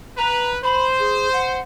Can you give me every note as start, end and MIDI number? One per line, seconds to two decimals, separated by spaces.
0.18 0.59 71
0.18 0.52 82
0.64 1.60 72
0.64 0.86 83
0.99 1.29 68
1.33 1.61 78